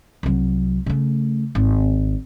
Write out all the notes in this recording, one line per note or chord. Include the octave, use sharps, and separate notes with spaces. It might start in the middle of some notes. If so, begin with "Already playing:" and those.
C2 F#3
C#3 A3
G#1